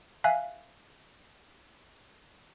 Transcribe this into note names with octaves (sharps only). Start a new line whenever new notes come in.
E5 F5 G#5 F#6